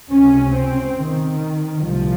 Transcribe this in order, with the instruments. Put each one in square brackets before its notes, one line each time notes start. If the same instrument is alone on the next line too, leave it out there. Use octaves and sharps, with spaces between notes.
[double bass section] C#2 C3 C#4
C4
D#3
C2 A#2 F3